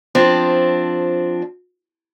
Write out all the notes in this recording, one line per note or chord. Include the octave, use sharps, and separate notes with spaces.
F3 C4 D4